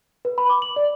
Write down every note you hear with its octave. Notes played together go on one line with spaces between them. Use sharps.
B4
B5
D6
F#7
D5